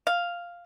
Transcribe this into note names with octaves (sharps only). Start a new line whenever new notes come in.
F5